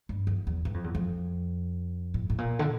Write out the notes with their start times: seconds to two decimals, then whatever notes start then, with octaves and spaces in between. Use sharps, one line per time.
0.09 G2
0.27 E2
0.47 E2
0.65 G2
0.74 F2
0.84 E2
0.95 F2
2.14 A2
2.30 A2
2.38 A#2
2.59 D3